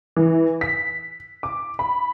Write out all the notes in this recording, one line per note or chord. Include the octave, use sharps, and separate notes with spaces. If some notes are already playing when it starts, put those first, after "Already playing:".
E3
B6
D6
B5